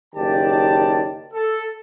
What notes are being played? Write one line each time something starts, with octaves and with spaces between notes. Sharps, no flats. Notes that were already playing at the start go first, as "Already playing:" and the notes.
F#1 D#3 G4 D5 A5
A4